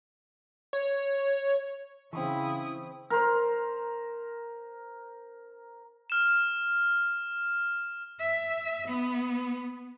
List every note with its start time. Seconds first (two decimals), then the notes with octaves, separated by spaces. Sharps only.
0.73 C#5
2.13 C#3 E3 C4 C#4 E4 B5 C#6 D#6
3.10 A#4 C5
6.10 F6 E7
8.20 E5
8.88 B3